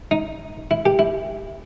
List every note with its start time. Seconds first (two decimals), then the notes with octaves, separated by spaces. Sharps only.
0.11 D#4
0.71 E4
0.86 G4
0.99 E4